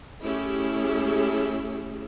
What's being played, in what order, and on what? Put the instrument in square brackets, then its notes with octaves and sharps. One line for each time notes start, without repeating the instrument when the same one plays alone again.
[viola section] A3 C#4 E4 G4 G#4